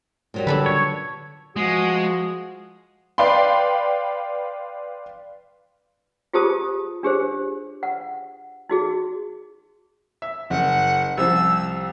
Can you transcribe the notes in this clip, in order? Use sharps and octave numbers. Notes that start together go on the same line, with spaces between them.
A#2 F#3 G3
D3 D4 A4 B4
C#5
F3 G#3 F#4 D#6
B4 D5 F5 G5 B5 C6
F4 G4 G#4 C5 A5 D#6
D4 G4 G#4 C5
F#5
D#4 F#4 G#4
E5
F#1 F#5
C2 F3 E6